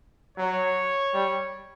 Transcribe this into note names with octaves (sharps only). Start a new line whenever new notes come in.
F#3 C#5
G3